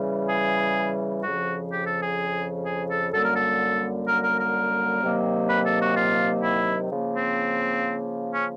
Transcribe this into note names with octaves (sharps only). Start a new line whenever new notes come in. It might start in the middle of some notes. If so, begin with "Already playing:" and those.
Already playing: C#3 E3 G3
G#4
F2 C#3 F3 F#4
G4
A4
G#4
G#4
A4
F#2 D3 G3 A#3 A4
A#4
A4
A#4
A#4
A#4
C3 D#3 F#3 A#3
B4
A4
F#4
F4
E4
C#3 F3 A#3
C4
C#4